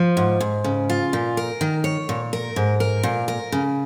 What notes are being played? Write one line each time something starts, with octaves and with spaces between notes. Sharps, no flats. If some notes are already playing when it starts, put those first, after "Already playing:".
Already playing: F3
G#2
G#2
C#3
F4
A#2
A#4
D#3
C#5
A#2
A#4
G#2
A#4
A#2
A#4
C#3